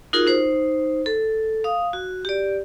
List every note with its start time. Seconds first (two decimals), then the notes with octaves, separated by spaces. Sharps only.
0.13 D#4 F4 F#4 G#4 A#4
0.27 D#4 C5
1.06 A4
1.64 F5 D#6
1.93 F#4
2.25 G4 D5